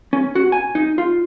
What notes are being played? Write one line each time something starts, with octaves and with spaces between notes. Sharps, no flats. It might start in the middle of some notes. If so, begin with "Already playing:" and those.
C#4
F#4
G#5
D#4
F4